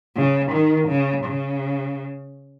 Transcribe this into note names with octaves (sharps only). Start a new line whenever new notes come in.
C#3
D#3
C#3
C#3